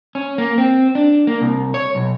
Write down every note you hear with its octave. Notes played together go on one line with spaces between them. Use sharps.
C#4
A#3
C4
D4
A#3
C2
C#5
B1